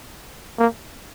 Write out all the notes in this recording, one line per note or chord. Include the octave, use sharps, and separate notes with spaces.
A#3